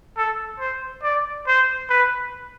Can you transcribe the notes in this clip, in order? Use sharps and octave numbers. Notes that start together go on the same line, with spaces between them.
A4
C5
D5
C5
B4